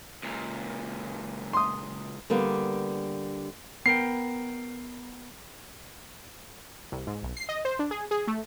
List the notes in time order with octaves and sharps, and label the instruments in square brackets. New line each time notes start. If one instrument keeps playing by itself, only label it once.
[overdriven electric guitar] C#2 A#2
[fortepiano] C6 D#6
[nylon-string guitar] D3 G3 A#3 B3
[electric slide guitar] B3 A#4 G5 [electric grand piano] C7
[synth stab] C2
G#2
B1
C7
D#5
C5
D4
G#4
G#4
A3